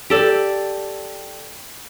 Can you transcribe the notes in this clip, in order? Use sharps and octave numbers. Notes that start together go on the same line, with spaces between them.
G4 A4 D5